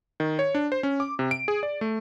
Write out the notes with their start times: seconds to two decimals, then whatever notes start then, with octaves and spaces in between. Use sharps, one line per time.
0.20 D#3
0.39 C#5
0.55 D4
0.72 C5
0.83 C#4
1.00 D6
1.19 C3
1.31 D7
1.48 G#4
1.63 D5
1.81 A3